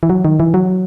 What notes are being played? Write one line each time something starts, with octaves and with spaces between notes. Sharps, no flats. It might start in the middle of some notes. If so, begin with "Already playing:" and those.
E3
F#3
D#3
E3
F#3